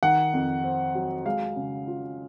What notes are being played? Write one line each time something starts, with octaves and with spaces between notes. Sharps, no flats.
D#3 F#5
F2
C4
F#3
G#3 F5
C#3
F4